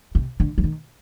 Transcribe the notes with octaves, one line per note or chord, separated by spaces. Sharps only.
C3
D3
F3
D#3